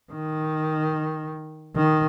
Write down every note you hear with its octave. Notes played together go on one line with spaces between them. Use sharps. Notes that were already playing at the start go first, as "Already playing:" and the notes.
D#3
D#3